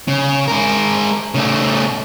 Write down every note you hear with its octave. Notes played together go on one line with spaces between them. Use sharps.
C#3
G#3 A#4
C#3 A3